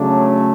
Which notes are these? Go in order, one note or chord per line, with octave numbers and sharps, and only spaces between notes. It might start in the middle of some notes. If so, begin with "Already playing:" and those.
Already playing: C#3 F#3 A3 D4